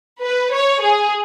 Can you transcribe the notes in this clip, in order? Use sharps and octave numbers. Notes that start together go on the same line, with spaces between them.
B4
C#5
G#4